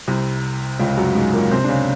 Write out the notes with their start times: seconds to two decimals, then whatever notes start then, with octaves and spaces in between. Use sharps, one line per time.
0.08 C2 C3
0.80 C#2 C#3
0.97 F#2 F#3
1.15 G#2 G#3
1.33 A#2 A#3
1.51 C3 C4
1.64 D4
1.69 C#3 C#4